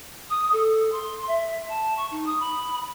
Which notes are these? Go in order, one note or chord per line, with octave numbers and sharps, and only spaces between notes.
D#6
A4
C6
E5
A5
C#6
D#4
D#6
B5